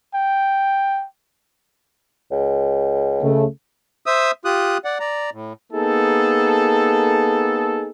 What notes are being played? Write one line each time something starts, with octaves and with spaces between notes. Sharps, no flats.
G5
C#2
C#3 A3
C5 E5 D#6 E6
F4 G4 D#6 F#6
D5 F#5
D5 A#5
A2
A#3 B3 D#4 G#4 A4